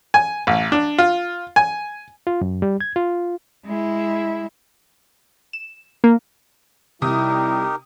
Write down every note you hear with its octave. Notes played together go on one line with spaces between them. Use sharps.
G#5
A1
D4
F4
G#5
F4
F#2
G3
G#6
F4
G#3 E4
E7
A#3
C3 G3 D#4 E4 G4 A#4 D#6